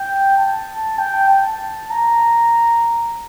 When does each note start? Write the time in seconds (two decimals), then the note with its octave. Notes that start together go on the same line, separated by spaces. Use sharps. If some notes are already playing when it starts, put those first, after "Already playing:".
Already playing: G5
0.38 A5
0.98 G5
1.29 A5
1.91 A#5